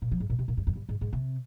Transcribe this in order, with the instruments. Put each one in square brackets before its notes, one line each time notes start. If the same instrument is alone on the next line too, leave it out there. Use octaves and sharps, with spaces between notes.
[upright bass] A#2
F3
G#2
A#2
C3
A#2
G2
F2
G2
G#2
G#2
C3